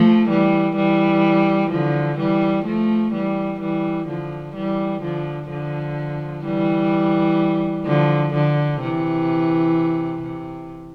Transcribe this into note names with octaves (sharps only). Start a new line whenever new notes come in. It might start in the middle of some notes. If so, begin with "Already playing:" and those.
Already playing: F3 A3
E3 G3
E3 G3
D3 F3
E3 G3
F3 A3
E3 G3
E3 G3
D3 F3
E3 G3
D3 F3
D3 F3
E3 G3
D3 F3
D3
C3 E3
C3